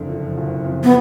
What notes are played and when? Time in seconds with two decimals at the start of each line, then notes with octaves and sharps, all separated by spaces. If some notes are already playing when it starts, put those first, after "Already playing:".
Already playing: F#1 F2 D3
0.09 F3
0.37 F#1
0.65 F2
0.84 B3